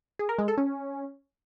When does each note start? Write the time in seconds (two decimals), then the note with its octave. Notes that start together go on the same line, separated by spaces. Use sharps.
0.19 G#4
0.29 A#4
0.38 G#3
0.48 A4
0.58 C#4